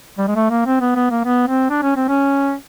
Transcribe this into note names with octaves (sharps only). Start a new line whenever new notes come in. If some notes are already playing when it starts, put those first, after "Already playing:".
G3
G#3
A3
A#3
C4
B3
B3
A#3
B3
C4
D4
C#4
C4
C#4